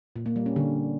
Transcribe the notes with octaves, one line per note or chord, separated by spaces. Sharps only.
A#2
A#3
G3
C#4
D3